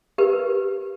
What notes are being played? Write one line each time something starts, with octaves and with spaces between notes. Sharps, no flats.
G4 A#4 B4